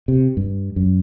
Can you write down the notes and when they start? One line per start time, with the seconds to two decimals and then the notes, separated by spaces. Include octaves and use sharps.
0.08 C3
0.37 G2
0.76 F#2